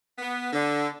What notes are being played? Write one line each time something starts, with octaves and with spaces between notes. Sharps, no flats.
B3
D3